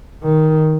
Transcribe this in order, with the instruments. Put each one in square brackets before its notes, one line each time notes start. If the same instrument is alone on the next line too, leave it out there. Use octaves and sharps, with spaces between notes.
[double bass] D#3